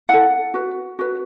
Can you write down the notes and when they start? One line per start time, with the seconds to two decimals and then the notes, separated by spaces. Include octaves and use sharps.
0.09 E4 A4 F#5
0.54 F#4 B4
0.99 F#4 B4